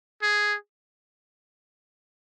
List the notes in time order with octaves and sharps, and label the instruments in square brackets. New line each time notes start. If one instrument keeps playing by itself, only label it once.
[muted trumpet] G#4